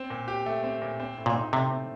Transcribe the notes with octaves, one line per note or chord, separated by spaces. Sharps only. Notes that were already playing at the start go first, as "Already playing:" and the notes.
Already playing: C4
A#2
G4
A3
C4
A#2
C4
A2
A#2
D#4
C3 A3
C4